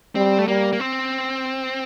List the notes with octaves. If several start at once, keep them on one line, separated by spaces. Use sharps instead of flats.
G3 C4
A3
G3 A#3
A#3
C4